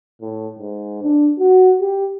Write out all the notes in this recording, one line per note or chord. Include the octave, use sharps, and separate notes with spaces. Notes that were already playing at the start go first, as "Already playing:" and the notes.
A2
G#2
D4
F#4
G4